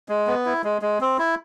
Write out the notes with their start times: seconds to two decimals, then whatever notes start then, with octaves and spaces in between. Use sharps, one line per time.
0.09 G#3
0.27 B3
0.45 E4
0.64 G#3
0.82 G#3
1.01 C4
1.18 E4